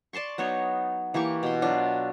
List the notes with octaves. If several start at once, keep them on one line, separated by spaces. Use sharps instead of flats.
D5 A5 C6 C#6
F#3 B3 D#4 C#5
E3 A#3 G4 C#6
B2 C6
F#3 D4 F4